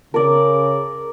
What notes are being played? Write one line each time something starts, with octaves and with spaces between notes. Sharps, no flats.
C#3 A#4 D5